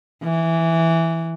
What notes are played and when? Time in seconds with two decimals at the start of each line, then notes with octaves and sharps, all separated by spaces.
0.23 E3